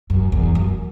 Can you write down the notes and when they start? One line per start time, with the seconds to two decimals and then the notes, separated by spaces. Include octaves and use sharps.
0.10 F#2
0.32 E2
0.55 F#2